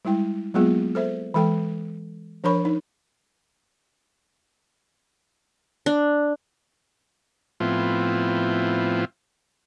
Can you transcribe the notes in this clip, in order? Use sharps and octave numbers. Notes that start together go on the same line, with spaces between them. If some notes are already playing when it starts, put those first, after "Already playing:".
G3 G#3 E4 G5
F#3 G#3 A#3 B3 F4 G#4
A4 C5 E5
E3 G#3 A4 G5
F3 D4 A#4 C#5 B5 C#6
D#4
D4
A2 F3 B3 C4 E4 F4